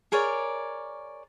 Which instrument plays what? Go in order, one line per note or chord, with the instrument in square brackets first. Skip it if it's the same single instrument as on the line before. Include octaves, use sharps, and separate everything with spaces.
[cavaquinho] G#4 A#4 C#5 D5